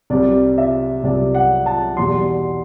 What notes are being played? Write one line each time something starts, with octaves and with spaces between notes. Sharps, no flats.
C2 C3 G3 D5
E5
C2 C3 G3 D5
F#5
A5
E2 B2 G3 C6